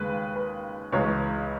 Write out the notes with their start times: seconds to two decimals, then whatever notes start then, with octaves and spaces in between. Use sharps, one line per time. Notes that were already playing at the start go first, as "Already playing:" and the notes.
Already playing: D#2 C#3 G#3 B4
0.35 B4
0.92 C#2 C#3 E3 G#3 C#5